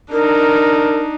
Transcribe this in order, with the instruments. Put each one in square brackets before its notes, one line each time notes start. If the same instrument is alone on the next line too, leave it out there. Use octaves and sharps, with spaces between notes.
[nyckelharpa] D4 D#4 [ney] A#4